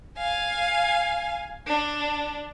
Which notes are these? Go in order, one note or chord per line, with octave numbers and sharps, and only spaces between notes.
F5 G#5
D4